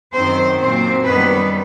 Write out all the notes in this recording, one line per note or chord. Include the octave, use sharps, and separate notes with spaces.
F#2 D#3 F#3 C4 C5
A#2 F#3 C4 C5
F#2 D#3 G3 B3 B4